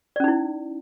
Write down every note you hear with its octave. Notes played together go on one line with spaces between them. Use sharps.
C#4 D#4 E4 D5